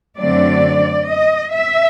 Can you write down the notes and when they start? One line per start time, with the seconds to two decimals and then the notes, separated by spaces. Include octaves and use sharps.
0.18 F#2 D3 F#3 A3 C4 D5
1.08 D#5
1.53 E5